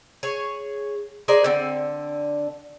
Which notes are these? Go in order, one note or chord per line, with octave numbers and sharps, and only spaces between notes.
G#4 C#5
G#4 A#4 C5 D5
D3 C4